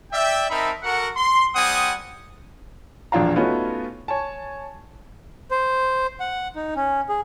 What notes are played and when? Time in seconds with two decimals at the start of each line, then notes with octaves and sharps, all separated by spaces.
0.12 D5 E5 G5
0.50 C4 D#4 A#4 E5 A5 B5
0.83 F#4 A4 A#4 F#5
1.16 C6
1.55 G3 C4 F#5 G#5 D#6
3.12 E1 A#1 D4 F4 F5 A#5
3.36 A3 B3 C#4 D#4 F4 F#4
4.08 C#5 G#5 A5
5.51 C5
6.20 F#5
6.56 D#4
6.76 C#4
7.09 G#4